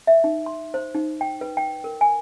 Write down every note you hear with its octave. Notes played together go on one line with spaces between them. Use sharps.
E5
D#4
C6
C5
D#4
G5
B4
G5
A#4
G#5